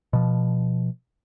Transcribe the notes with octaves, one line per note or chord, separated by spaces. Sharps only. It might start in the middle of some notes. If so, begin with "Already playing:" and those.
B2 F3